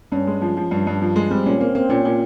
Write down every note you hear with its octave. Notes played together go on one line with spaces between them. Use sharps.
G2 C#4
G#3
F3
F3
G2
G2
F3
G#3
G3 C4
A#2 C#4
A#3 C4
A#3 C4
A#2 C#4
A#2